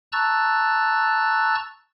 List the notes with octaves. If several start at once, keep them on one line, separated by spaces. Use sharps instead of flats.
A5 A#5 C#6 E6 F#6 A6